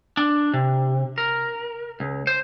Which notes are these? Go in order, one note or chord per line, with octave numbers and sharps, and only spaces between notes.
D4
C3
A#4
C#2
C5